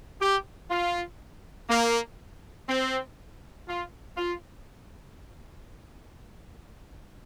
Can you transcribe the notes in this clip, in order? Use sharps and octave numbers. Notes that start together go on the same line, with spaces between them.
G4
F4
A#3
C4
F4
F4